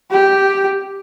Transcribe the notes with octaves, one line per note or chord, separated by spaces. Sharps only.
G4